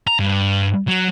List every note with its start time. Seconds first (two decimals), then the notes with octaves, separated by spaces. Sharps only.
0.07 A#5
0.19 G2
0.88 F#3